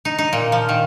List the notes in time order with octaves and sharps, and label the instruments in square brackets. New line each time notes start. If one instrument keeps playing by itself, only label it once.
[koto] D#4
D#4
A#2
F3
D#3